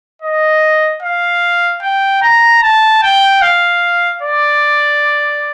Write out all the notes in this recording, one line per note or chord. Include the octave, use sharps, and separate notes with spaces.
D#5
F5
G5
A#5
A5
G5
F5
D5